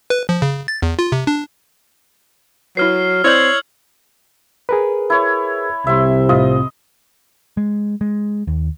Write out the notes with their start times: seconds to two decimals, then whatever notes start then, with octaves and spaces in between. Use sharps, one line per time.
0.10 B4
0.29 F3
0.42 C#3
0.68 A6
0.82 E2
0.99 F4
1.12 C3
1.27 D4
2.77 F#3 E4 B4 F6 C7
3.24 C4 E4 C#5 D5 E6 G6 G#6 F#7
4.69 G#4 A#4 B4
5.10 E4 C#5
5.87 C2 C3 E5 C6
6.29 A2 F4 D#5
7.57 G#3
8.01 G#3
8.47 D#2